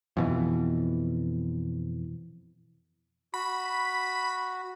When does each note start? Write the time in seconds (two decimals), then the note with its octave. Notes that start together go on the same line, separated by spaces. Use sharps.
0.17 F2 B2 E3
3.34 F#4 B5